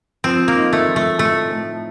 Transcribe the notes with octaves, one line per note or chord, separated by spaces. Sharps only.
F3 C4
A#3
D#4
A3
F3
A3
A2 A3
A2